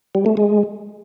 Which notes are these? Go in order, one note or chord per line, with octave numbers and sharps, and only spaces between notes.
G3
A3
G#3